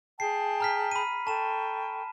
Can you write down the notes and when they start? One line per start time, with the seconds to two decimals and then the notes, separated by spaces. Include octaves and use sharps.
0.20 G#4 G5 A5 C7
0.60 A#5 F6 B6
0.91 B5 D#7
1.27 A4 G5 A5 C#6 E7